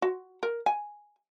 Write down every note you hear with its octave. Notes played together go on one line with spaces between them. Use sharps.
F#4
A#4
G#5